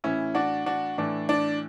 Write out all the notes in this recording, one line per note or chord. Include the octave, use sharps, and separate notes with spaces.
A2 E3 C#4 E4
D4 F#4
D4 F#4
A2 E3 D4
D4